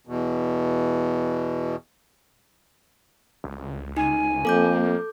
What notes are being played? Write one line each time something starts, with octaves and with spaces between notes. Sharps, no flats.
E2 B2
C#2
D#4 G#5
F2 A#3 A4 D6 G6